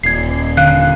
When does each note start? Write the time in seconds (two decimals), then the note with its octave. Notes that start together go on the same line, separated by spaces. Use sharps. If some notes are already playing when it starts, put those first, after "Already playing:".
0.03 D#1 G#6 C7
0.57 D3 F5 F#6